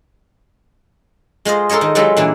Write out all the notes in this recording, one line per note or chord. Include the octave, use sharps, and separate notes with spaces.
G#3 F4 C5 D#5
A4 A#4 C5 C#5 D#5
D#3
F#3 G#3 F4 G4 A4 B4
A#2 E3 D4